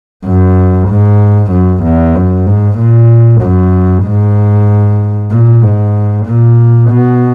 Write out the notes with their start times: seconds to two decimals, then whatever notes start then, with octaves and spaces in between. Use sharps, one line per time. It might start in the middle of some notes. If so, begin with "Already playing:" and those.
0.25 F#2
0.89 G#2
1.51 F#2
1.84 E2
2.15 F#2
2.46 G#2
2.78 A#2
3.42 F#2
4.05 G#2
5.32 A#2
5.63 G#2
6.26 A#2
6.90 B2